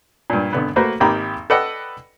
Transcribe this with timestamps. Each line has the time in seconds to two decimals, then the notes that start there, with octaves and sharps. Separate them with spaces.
0.30 G2 A#2
0.53 G#1 D3 B3
0.76 A3 A#3 F#4 B4 C5
1.00 G#1 A#3 D#4 G4 B5
1.50 A4 B4 D5 D#5 F#5 G5